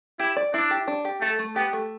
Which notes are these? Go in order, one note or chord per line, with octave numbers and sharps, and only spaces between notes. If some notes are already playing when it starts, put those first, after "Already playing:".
E4 G4
D5
D4 E4
G4
D4
G4
A3 A4
A3
B3 G4
A3